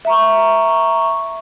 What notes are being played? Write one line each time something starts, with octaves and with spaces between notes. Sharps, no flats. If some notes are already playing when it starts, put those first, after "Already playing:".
E5 A#5 C#6